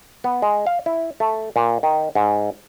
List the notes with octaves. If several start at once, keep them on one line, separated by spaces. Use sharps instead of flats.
B3
G#3
F5
E4
A3
A#2
D#3
G#2